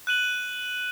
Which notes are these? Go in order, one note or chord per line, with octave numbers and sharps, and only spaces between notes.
F#6 D#7 F#7